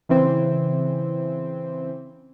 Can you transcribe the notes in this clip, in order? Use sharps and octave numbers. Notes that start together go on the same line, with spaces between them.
C#3 E3 C4